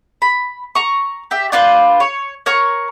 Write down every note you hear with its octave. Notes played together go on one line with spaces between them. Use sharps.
B5
A#5 C#6
G4 E5
D4 F4 B4 C5
C#5
A#4 C#5 A#5 C#6